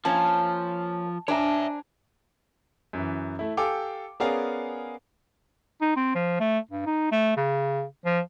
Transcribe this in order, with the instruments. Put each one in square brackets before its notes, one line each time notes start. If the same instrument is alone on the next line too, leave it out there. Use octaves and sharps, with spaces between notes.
[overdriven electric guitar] F3 [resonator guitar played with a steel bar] A#3 C#4 [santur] A5
[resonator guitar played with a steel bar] D4 [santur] C5 G#5 A#5 [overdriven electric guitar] C#5 E5
[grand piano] F#2 E3
A3 E4
G4 A4 F5 G5 G#5 D6
B3 C#4 G#4 A#4 D5 F5
[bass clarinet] D#4
C4
F3
A3
G2
D#4
A3
C#3
F3